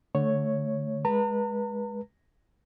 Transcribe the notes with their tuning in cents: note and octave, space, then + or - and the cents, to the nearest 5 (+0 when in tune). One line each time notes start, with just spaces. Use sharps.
D3 +0 A3 +0 C#5 +0
G#3 +0 B4 -30 A#5 -45